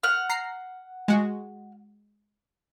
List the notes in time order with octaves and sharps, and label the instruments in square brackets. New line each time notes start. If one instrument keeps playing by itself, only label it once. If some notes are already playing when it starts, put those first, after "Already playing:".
[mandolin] F#5 F6
[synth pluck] A#5 C7
G#3 F#4